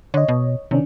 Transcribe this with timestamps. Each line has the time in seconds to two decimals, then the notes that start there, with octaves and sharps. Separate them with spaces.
0.14 D3 C#5 D#5
0.28 B2
0.71 C3 D#3 C#4 D4